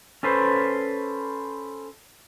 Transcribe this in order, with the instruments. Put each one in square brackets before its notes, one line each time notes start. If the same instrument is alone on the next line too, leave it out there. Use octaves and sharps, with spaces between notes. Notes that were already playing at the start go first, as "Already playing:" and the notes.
[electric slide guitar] C#4 A4 B4 C5